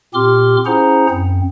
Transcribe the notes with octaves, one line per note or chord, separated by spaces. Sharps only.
A#2 C4 G4 C6 D6 F6
C#4 E4 G#4 C5 F#5 A#5
F#2 C4